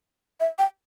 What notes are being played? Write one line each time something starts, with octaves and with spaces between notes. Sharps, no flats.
E5
G5